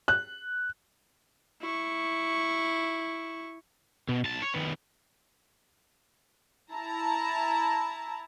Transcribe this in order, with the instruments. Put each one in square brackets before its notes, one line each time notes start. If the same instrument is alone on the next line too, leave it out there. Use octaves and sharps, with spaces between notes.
[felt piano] F#6
[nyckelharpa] E4 C#6
[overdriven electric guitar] B2
B1 A5
C#5
D#3 B3
[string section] E4 A5 A#5